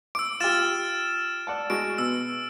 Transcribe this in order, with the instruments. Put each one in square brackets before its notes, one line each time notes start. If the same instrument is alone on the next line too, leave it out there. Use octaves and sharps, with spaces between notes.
[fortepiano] D6 [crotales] E6 D7
[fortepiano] F4 G4 [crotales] F6 A6 E7
[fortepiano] D5 F#5 A5
[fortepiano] G#3 F#4 D#5 [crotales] D7
[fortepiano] B2 [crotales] E6